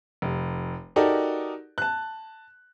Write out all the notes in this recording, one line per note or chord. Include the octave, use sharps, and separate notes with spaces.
F1
D#4 F#4 G4 A4 A#4 D5
A5 F#6